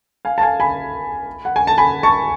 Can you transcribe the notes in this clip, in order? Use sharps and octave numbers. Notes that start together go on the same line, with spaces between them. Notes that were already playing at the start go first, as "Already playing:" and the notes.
F5 G#5
A5
F5 G#5
G#5 B5
F#5
G#5
A5
G#5 B5
A5 C#6